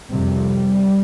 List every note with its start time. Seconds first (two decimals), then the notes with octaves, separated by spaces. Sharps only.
0.10 F2 C3 G3